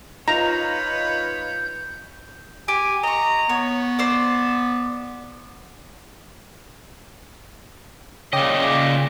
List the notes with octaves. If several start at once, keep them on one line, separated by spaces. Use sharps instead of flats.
D#4 F4 B4 C#5 A#5 G6
G4 G#5
D#5 A#5 C#6
B3 C#5
C5 D5
A#2 C#3 C#5 D#5 G5 D6